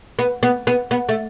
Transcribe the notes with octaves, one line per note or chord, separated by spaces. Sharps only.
B3
B3
B3
B3
A3